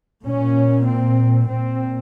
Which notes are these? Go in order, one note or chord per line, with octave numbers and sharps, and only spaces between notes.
A#2 C#4
C4
A#2 C4